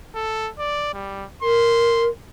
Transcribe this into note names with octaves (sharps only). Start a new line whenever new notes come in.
A4
D5
G3
A#4 C6